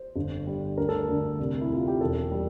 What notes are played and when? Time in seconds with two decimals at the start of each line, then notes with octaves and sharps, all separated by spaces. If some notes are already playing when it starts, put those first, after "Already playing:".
Already playing: C5
0.16 G1
0.47 G3
0.78 D2 A#4
0.89 A4
1.00 A#4
1.08 D2
1.39 C2
1.61 E4
1.70 C2 F4
1.88 G4
2.01 E1 A4
2.31 G3